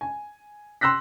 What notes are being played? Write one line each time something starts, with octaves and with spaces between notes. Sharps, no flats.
G#5
C6 E6 F#6 A#6 B6